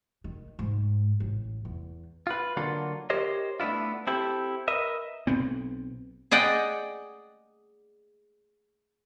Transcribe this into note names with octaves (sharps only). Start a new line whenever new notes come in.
D#3
G#2
A1
E2
F4 B4
D3 F#3 A#3 F4 A4
G4 A#4 C5 C#5 D#5
A3 B3 D4 E4 F4
C4 E4 G4 A4
A#4 B4 D#5 E5
B1 B3 C4
G#4 D5 D#5 F#5 G5